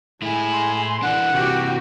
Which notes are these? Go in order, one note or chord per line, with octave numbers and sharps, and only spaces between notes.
A2 G#3 E4 G#5
C6
E3 D4 F#5
C3 E3 F#4 G4